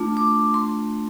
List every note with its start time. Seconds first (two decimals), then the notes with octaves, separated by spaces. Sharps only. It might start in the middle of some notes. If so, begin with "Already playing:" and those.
Already playing: A3 D4 F4
0.17 D6
0.54 C6